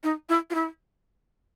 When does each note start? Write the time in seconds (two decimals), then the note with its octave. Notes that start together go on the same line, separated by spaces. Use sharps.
0.04 D#4
0.29 E4
0.50 F4
0.55 E4